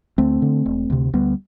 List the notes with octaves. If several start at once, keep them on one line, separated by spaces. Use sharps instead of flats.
D2 A3 C4
D3
E1
D2 C3
D2 G3 B3